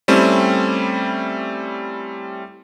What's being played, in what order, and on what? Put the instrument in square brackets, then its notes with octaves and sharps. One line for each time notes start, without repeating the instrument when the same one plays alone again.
[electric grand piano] G3 A3 C4 C#4 E4